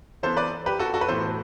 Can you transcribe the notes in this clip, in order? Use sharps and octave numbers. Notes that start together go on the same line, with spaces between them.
E3 B3 A4 C5
B4 D5
G4 B4
F#4 A4
F#4 A4
B4
A2 E3 B3 A4 C5